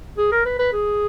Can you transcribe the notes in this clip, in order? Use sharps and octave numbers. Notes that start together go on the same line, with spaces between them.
G#4
A#4
B4
B4
G#4